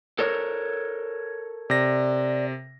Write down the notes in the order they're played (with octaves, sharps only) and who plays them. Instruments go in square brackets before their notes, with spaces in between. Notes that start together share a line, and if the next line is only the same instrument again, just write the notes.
[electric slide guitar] A4 A#4 C#5
[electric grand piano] C3 A#6 [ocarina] D5